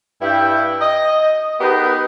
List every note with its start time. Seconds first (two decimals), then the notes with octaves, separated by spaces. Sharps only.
0.21 G2 E4 G5
0.81 D#5
1.60 B3 D#4 G4 G#4 A#4 B4